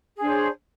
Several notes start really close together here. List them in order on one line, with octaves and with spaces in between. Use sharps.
G#4 D4 C5 C#5